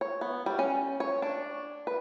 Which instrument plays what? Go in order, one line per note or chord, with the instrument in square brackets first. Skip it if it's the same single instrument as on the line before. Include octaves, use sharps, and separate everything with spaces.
[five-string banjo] C#5
B3
G3
C#4
C#5
D4
B4